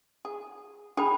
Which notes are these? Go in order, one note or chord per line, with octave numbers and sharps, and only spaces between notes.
G#4
D4 G#4 G5 B5